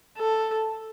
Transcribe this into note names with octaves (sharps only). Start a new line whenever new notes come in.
A4